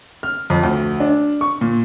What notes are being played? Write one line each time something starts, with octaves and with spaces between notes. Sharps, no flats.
F6
F2
D2
D4
C#6
A#2